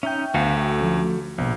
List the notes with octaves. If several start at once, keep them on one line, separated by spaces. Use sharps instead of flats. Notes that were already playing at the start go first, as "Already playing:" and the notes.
C#4 D#4 E5 G5 G6
D2 B3 F#4 F5
F#4 A4
F3 A3 C#4
A#1 B2 B3